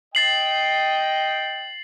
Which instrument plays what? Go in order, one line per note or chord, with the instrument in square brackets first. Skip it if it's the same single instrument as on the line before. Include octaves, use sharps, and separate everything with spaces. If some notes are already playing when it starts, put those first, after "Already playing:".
[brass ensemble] D#5 G5 [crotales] A6 C7 F#7